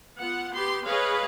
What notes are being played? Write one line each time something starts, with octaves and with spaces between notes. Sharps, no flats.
B3 F4 F#5
B3 G4 B4 C6
G#4 B4 C#5 D#5 F5